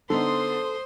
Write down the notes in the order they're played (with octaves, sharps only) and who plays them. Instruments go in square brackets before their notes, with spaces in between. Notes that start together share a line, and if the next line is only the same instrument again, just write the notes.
[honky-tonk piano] D3 B3 D#4 [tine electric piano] A4 [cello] C5 [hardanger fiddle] C6 D#6